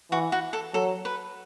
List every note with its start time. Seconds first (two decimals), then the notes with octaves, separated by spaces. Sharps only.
0.11 E3 F#4
0.32 F#4
0.53 A4
0.74 F#3 A4
1.05 B4